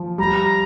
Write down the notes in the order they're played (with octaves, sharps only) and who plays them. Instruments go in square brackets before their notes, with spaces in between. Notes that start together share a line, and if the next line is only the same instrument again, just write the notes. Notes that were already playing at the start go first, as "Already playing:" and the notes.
Already playing: [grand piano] F3
[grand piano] G3 [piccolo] A#5